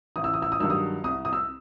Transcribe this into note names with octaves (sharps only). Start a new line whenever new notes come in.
A1 D#6
E6
D#6
E6
D#6
G2 D#3 F#3 E6
D#6
C2 D#6
D#6
E6